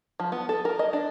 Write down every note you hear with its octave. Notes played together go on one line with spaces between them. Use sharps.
F3
B3
A4
A#4
D#5
D4